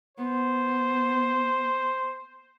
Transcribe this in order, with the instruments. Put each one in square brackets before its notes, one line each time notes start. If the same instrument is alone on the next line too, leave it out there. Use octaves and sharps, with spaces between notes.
[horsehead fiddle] B3 [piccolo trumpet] C5